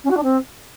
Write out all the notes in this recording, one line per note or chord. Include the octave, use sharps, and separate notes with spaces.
C#4
F#4
D4
C4